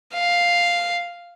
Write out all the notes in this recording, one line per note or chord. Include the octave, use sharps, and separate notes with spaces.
F5